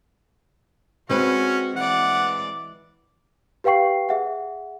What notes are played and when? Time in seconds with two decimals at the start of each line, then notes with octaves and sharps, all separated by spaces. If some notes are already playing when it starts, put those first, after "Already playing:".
1.10 G#3 C4 C#4 F#4 B4
1.76 E3 D5 F#5
3.64 G4 B4 F5 G5 C#6 C7
4.09 G#4 E5 F#5